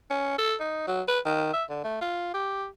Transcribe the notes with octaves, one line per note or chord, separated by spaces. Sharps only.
C#4
A4
D#4
F#3
B4
D#3
E5
D3
A3
F4
G4